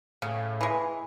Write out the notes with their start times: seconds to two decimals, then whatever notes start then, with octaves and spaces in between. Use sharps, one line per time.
0.22 A2 C#3
0.61 E3 G#3